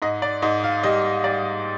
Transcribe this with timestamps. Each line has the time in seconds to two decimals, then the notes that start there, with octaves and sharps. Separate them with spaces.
0.02 G#2 D#5
0.22 D5
0.42 G#2 D#5
0.64 F5
0.83 G3 D#5
1.24 G3 D5